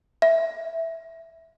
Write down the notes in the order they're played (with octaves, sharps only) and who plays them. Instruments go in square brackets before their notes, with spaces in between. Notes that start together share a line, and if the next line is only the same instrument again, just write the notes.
[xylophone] E5